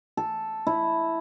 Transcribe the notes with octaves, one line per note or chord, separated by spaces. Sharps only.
A4
E4